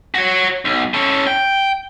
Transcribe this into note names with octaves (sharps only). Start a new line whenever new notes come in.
F#4 C#5
B1
C#4 A4
G5